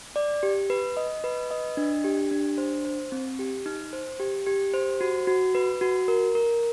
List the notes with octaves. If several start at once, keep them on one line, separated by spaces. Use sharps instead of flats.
D5
G4
B4
D#5
B4
D#5
D4
G4
D4
C5
C5
C4
G4
D#4
C5
G4
G4
C5
F#4
F#4
B4
F#4
A#4
A#4